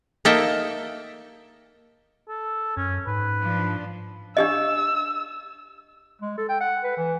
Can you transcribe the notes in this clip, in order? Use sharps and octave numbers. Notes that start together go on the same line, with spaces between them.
A#3 D#4 A4 E5 G5 A5
A4
F#2 C#4
G#2 B4
F3 D4
D4 G4 D#5 E6
G#3
A4
G5
F#5
B4
E3